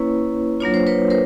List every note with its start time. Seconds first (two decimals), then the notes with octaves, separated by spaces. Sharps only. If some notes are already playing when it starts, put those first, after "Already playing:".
Already playing: A#3 C#4 E4 B4 C#5
0.60 F#3 A#3 D4 F4 C#5
0.74 C5
0.87 B4 C#5
1.10 A#4 C5